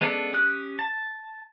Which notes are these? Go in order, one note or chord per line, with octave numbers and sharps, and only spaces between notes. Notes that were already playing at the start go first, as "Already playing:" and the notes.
G#3 B3 C#4 D4 A4
C#4 G4 D#6 F#6
A5